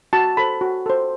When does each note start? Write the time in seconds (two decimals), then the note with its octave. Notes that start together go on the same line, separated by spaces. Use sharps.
0.13 F#4 A5
0.37 A4 C5 B5
0.61 F#4
0.86 A4 C5